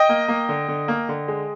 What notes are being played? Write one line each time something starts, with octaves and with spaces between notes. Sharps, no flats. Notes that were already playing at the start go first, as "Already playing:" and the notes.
Already playing: D#5 G5
A#3
A#3
D3
D3
A#3
D3
G#3